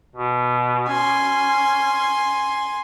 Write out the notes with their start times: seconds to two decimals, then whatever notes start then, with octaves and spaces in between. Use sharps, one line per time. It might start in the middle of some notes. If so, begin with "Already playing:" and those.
0.15 B2
0.88 C#4 G#5 C6